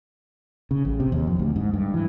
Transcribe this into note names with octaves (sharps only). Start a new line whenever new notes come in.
C#3
A1
C3
D#2
F2
D2
G#2
G2
E3